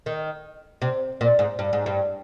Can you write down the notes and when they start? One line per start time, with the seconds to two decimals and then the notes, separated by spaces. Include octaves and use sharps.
0.06 D#3
0.82 C3
1.21 A#2
1.39 G#2
1.59 G2
1.73 G#2
1.86 G2